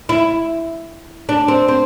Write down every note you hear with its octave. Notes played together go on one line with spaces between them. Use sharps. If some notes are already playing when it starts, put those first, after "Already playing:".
E4
D4
C4
C4